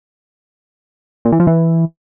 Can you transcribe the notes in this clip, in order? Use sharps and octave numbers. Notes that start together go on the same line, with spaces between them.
A#2
E3
F3
E3